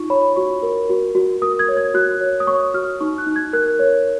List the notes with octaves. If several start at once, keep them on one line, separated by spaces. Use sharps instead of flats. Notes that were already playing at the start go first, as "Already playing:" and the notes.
Already playing: D#4 F4 C#6
C#5 B5
F#4 C#6
A#4
F#4
F#4
A#4 D#6
G#6
C#5
G#6
F#4 F#6
C#5
D#6
C#5 C#6
F#4 F6
D#4 C#6
F#6
D#4
G#6
A#4 F#6
C#5